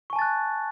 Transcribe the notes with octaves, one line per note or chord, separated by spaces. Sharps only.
G#5 A5 C#6 F#6 A6